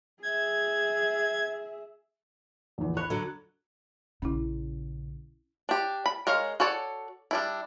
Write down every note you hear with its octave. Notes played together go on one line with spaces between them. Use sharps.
G#4 E5 G#6
A#1 E2
C#5 B5 F#6
D3 F#3
A#1 C#3 C#4 E4
D4 G4
B5
G#3 A#4 C#5 F5
F#4 A4 C#5 D5
G3 D4 E4